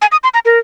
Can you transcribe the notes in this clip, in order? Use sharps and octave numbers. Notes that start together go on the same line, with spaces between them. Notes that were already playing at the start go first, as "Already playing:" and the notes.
G#5
D#6
C6
A#5
A#4